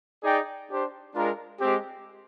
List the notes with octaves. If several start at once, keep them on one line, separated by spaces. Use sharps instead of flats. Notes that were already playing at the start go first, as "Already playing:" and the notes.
D#4 G#4 D5 G5
D4 G4 C5
G#3 D4 F4 A#4 F5
G#3 C4 G4